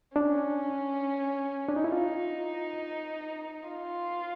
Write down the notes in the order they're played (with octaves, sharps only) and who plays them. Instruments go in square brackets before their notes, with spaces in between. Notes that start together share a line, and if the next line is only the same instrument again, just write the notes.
[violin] C#4 [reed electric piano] D4
[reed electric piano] D4
D#4
E4
[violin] D#4 [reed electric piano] F4
[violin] F4